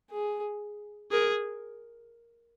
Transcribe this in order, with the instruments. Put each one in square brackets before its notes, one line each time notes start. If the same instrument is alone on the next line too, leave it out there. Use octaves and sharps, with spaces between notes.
[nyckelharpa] G#4
[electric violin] G#4 [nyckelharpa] A#4